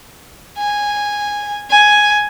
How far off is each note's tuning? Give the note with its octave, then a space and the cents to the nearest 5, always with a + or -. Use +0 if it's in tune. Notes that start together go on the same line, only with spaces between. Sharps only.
G#5 -10
G#5 +5